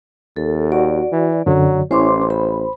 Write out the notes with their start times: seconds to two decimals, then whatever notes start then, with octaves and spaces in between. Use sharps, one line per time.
0.36 D#2 A4
0.72 F#4 D5
1.12 E3
1.47 F#2 D3 F#3
1.91 A1 C#4 E4 C5 C#5 C6 D6
2.30 C5 B5